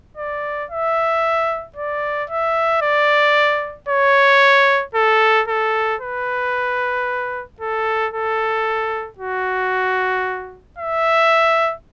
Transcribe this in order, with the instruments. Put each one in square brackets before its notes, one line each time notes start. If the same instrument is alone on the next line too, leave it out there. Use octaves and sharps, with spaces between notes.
[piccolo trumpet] D5
E5
D5
E5
D5
C#5
A4
A4
B4
A4
A4
F#4
E5